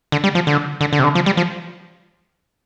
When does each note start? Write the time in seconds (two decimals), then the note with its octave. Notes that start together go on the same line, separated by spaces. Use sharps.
0.12 D3
0.24 G3
0.35 F3
0.47 D3
0.81 D3
0.93 D3
0.99 C3
1.04 D3
1.15 F3
1.26 G3
1.37 F3